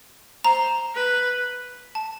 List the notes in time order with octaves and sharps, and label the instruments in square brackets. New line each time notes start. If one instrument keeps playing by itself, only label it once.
[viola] C5 [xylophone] A#5
[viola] B4
[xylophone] A5